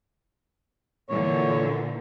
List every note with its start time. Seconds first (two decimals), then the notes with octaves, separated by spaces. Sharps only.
1.09 A#2 D3 E3 C#5